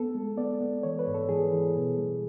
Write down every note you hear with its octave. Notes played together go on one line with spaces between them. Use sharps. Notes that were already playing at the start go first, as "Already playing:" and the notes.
Already playing: B3 A4
G#3
B3 D5
B3
E3 C#5
B4
G#2
A4
E3 G#4
E3
B2
G3